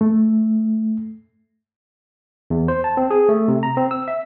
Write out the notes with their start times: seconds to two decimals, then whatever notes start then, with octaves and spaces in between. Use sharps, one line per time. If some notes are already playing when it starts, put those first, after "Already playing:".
0.01 A3
2.50 E2
2.68 C5
2.84 A5
2.97 C4
3.11 G#4
3.29 A3
3.48 C3
3.63 A#5
3.77 C4
3.91 E6
4.08 E5